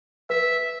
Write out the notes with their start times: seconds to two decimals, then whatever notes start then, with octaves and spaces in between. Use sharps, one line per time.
0.30 B4 E5